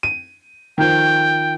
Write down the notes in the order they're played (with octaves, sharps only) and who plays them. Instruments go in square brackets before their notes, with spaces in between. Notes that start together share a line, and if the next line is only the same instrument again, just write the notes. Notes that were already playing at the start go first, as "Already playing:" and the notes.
[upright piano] D#7
[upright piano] D#3 F3 [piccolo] G5